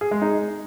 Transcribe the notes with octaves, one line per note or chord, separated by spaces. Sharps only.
G#4
G#3
D#4